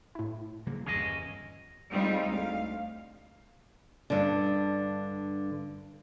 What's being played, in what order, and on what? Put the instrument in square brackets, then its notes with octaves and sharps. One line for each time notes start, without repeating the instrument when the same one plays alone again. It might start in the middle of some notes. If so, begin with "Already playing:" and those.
[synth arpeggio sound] A2 E4
[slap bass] C#3 F#3 A#3
[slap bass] G1 E2 G2 [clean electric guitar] C#4 G#4 D#5
[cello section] G3 G#3 C4 D#4 F4
D2 F5
[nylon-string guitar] G2 D3